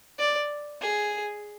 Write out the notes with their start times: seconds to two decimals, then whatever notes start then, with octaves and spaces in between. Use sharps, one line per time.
0.19 D5
0.82 G#4